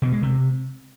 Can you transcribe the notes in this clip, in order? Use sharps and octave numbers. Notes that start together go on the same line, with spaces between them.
B2
G#3
C3